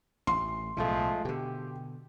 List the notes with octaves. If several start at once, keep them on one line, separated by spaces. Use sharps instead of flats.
A1 C6
B1 A2 C#3 F3 G#3 A3
B2 D3 G4